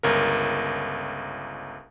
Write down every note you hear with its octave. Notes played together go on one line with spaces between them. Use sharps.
G1 C#2 A#4